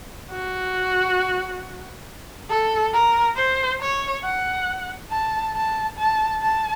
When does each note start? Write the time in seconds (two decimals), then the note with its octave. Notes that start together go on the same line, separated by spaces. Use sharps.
0.31 F#4
2.50 A4
2.93 A#4
3.36 C5
3.81 C#5
4.24 F#5
5.11 A5
5.56 A5
5.98 A5
6.42 A5